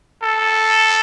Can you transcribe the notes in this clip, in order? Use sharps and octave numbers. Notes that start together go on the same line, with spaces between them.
A4